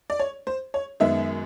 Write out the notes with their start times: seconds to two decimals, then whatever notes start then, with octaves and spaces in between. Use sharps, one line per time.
0.10 D5
0.19 C#5
0.47 C5
0.74 C#5
1.00 F#2 D#3 G#3 B3 E5